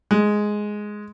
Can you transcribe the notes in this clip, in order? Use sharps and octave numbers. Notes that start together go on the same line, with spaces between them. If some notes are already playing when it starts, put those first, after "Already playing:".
G#3